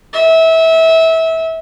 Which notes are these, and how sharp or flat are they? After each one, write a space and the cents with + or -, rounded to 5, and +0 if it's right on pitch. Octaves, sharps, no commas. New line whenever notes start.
E5 -25